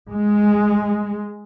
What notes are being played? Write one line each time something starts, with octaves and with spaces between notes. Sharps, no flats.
G#3